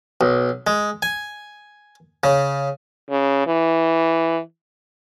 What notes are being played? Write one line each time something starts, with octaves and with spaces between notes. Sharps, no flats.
B1
G#3
G#5
C#3
C#3
E3